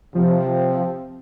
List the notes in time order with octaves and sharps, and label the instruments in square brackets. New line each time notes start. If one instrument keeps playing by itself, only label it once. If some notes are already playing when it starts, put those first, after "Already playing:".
[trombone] C3 [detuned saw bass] F3 [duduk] C4